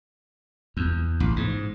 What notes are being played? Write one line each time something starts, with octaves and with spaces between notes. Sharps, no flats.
E2
A1
G#2